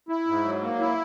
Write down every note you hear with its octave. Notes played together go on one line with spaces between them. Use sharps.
E4
G#2
F#3
A#3
E4